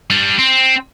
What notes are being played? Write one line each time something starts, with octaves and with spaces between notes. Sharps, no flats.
G3 D4
C4